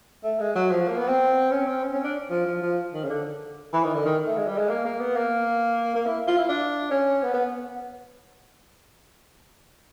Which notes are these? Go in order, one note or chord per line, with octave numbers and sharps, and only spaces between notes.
A3
G#3
F#3
F3
A#3
B3
C4
C#4
C4
C#4
C#4
D4
F3
F3
F3
D#3
C#3
D3
E3
D#3
D3
D#3
A3
G#3
G3
G#3
A#3
A#3
B3
A#3
A#3
E4
F4
E4
D4
C#4
B3
B3